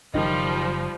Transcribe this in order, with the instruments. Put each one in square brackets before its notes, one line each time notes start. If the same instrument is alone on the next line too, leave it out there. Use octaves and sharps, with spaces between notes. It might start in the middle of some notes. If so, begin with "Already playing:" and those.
[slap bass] F#1 [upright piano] D#3 D#5 [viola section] F3 G3